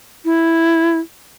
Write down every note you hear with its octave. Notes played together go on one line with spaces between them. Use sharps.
E4